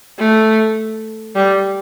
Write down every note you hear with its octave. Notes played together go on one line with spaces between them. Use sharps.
A3
G3